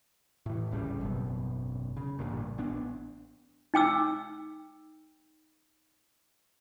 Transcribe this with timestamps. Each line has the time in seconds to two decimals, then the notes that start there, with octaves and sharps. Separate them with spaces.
0.46 A2 E3
0.71 D1 G#1 C#3 G3
1.01 G#1 F#2 B2
1.97 C#3
2.19 A1 G2 A#2
2.58 A1 B3 D4
3.74 D#4 G5 D6 E6